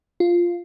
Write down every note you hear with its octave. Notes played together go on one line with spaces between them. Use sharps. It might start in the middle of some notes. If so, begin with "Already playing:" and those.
F4